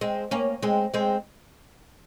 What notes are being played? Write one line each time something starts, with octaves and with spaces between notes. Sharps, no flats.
G#3 C4
A#3 C#4
G#3 C4
G#3 C4